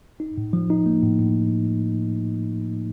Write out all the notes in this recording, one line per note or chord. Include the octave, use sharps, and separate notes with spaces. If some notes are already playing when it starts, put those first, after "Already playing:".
D#4
A2
F3
D#4
A#3
A2
A2